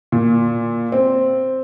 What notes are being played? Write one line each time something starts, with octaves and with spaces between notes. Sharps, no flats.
A#2
C4